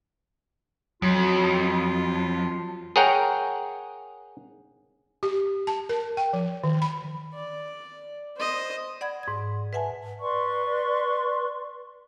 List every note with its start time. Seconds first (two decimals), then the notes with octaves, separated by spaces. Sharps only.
1.02 F2 F#3 F4
2.96 G#4 A#4 C#5 F#5 G5 A#5
5.23 G4
5.67 A5
5.89 A#4
6.17 G5
6.33 F3
6.64 D#3
6.82 B5
7.34 D5
8.37 C5 D#5
9.01 D5 F#5 B5 G#6
9.23 G#2 G#6
9.73 B4 E5 F#5 G#5 A5
10.21 B4 D5 C6 C#6